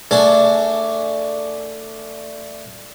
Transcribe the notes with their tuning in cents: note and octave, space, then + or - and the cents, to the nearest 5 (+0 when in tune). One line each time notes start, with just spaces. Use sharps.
A3 +20 D4 +0 G#4 +15